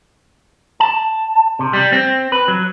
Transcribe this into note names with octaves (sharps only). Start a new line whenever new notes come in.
A5
C3
G3
C4
B4
F#3